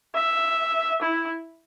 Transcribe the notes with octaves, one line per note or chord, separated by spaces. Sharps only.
E5
E4